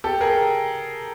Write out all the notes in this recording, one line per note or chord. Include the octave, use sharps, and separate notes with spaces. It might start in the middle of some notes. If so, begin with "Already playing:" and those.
G4 A4
G#4 A#4